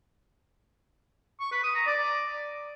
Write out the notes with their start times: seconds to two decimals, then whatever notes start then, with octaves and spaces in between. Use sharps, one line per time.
1.40 C#6
1.52 B4
1.63 D#6
1.75 A#5
1.87 D5